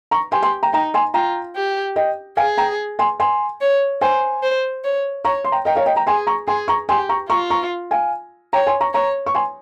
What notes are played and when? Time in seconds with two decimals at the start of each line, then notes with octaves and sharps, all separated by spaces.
0.11 A#5 C#6
0.32 G4 G#5 C6
0.43 G#5 C6
0.63 G5 A#5
0.73 D#4 G5 A#5
0.94 G#5 C6
1.14 F4 G5 A#5
1.56 G4
1.96 D#5 G5
2.37 G#4 F5 G#5
2.57 G5 A#5
2.99 G#5 C6
3.20 G#5 C6
3.61 C#5
4.01 C5 G#5 C6
4.43 C5
4.84 C#5
5.25 C#5 A#5 C#6
5.44 C6
5.52 G5 A#5
5.65 A#4 D#5 G5
5.75 C#5 F5
5.86 D#5 G5
5.96 G5 A#5
6.07 G#4 G#5 C6
6.27 A#5 C#6
6.48 G#4 G#5 C6
6.68 A#5 C#6
6.89 G4 G#5 C6
7.09 A#5 C#6
7.29 F4 A#5 C#6
7.50 A#5 C#6
7.91 F5 G#5
8.53 C#5 G5 A#5
8.67 G#5 C6
8.81 A#5 C#6
8.94 C#5 A#5 C#6
9.26 C#6
9.35 G#5 C6